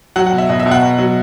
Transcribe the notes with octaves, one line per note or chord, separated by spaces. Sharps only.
F#3 F#5
F#5
B2
E5
B2 D#5
E5
B2
F#5
B2
F#3